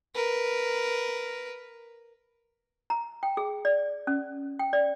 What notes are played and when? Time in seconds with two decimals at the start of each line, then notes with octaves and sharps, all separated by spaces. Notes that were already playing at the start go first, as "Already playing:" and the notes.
0.15 A#4 B4
2.90 A#5
3.23 G5
3.37 G#4
3.65 D5
4.07 C#4
4.59 G5
4.73 D5